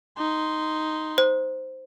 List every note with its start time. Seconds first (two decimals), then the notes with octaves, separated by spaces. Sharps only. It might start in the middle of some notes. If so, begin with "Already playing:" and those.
0.18 D#4 C6
1.18 C5